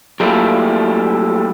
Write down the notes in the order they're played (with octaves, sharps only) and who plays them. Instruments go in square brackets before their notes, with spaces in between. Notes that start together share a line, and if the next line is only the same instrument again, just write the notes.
[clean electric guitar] F#3 G3 A3 A#3 E4 F4